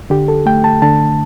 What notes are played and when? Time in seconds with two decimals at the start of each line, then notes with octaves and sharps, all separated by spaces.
0.10 D3 G4
0.28 A4
0.46 A3 G5
0.64 A5
0.82 D3 A5